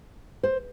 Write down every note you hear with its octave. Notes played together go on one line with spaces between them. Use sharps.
C5